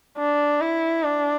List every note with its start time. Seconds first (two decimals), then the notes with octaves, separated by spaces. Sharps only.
0.18 D4
0.61 E4
1.03 D4